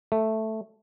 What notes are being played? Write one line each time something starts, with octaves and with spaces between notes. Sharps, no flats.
A3